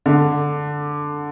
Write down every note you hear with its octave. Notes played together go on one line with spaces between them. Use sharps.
D3